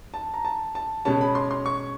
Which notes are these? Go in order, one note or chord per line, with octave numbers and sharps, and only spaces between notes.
A5
A#5
A5
A5
B2 G#3 C#4 A5
B5
C6
C6
C#6